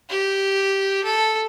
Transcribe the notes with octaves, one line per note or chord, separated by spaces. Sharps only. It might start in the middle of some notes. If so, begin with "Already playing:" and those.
G4
A4